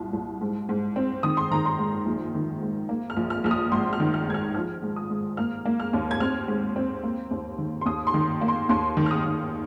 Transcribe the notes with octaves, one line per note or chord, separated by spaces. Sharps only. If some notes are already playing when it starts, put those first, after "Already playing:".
Already playing: C2 A#2
C2
G#2
G#2
C4
D#3 D#6
C6
D#3 A#5
C6
G#2
A#1
D#3
G#2
A#3
F6
A#1
F6
A#1 F6
D#6
G#1 C6
F6
D#3
F6
G#2 G#6
F6
F3 F6
G#2
D#6
G#2
A#3 F6
A#3
F6
D#2
G#6
C4 F6
G#2
C4
A#3
D#2
D#3
C6
D#2 D#6
C6
D#3
A#3
C6
D#2 C6
D#3
F6
D#6
D#3